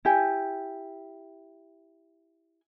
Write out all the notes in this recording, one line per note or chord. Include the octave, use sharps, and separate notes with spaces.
E4 G4 G#5